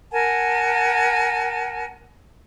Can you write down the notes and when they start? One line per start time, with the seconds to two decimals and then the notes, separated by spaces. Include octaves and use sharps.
0.12 A#4 F#5 G#5 A5